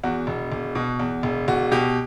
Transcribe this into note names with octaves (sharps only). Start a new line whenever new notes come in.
E2 F#4
E1
E1
B2
E2
E1
E1 F#4
B2 G4